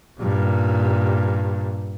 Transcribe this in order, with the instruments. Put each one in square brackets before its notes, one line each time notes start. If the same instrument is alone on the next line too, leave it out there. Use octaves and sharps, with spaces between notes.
[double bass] G2 A#2